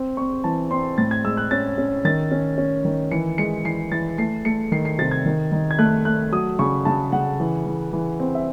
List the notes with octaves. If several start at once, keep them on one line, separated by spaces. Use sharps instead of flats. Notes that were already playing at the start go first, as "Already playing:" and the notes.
Already playing: C4
C4 C#6
E3 A5
C4 C6
A2 A6
G#6
G#3 E6
F#6
C#4 A6
C#4
D#3 A6
C#4
C#4
D#3
E3 C#7
G#3 C#7
E3 C7
E3 A6
A3 C7
A3 C#7
D#3 C7
C7
C3 A6
G#6
D#3
D#3
G#6
A3 F#6
A3 F#6
F#3 D#6
C#3 C#6
C#3 A5
C#3 F#5
E3
E3
E3
C4
E5